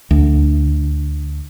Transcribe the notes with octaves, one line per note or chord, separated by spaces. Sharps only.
D2